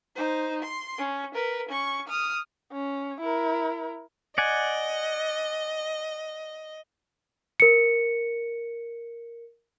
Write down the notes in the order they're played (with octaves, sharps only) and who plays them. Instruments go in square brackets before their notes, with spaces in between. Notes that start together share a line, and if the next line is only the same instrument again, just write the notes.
[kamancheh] D#4 C5
C6
C#4
A#4 B4
C#4 C#6
D#6 F6
C#4
E4 A#4
[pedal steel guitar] D5 F#5 G#5 [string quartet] D#5
[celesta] A#4 C#7